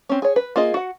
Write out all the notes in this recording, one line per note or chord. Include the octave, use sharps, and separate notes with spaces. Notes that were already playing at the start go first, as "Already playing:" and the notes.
C4 C#4
G#4 C#5
B4
A#3 F4 G#4 D#5
F#4 F#5